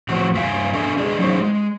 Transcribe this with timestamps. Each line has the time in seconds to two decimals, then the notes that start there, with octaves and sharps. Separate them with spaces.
0.09 A2 F3 C4 F#4
0.34 G2 E5 F5 G#5
0.73 D4 A4 D#5 E5 G#5
0.97 D4 G#4 D#5
1.19 F#3 C#4 D#4 G#4 C5
1.40 G#3